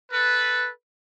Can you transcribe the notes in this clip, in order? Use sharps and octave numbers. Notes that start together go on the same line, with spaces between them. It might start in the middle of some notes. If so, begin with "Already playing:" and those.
A4 B4